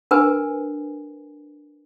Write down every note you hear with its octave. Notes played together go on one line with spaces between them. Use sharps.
D4 A#4 B4 G#5